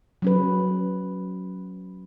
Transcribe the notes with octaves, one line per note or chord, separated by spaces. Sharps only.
F#3 C#4 B4